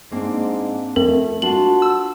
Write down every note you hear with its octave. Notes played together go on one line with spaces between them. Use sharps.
G#2 A#3 C4 D4
F2 A3 A#4
D4 F4 F#4 A5 F#7
E6